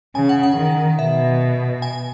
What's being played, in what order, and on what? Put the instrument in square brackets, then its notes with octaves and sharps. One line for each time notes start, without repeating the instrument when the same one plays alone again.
[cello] C#3 [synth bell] G#5
[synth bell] F#5
F#5
[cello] D#3
[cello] B2 [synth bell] E5
[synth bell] G#5